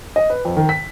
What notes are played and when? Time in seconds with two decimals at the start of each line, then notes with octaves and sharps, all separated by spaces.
0.16 D#5
0.30 B4
0.45 F2
0.56 D#3
0.69 B6